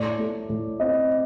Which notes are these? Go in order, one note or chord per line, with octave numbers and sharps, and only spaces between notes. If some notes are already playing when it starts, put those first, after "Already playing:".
Already playing: A2 D5
A3
A2
C4 D#5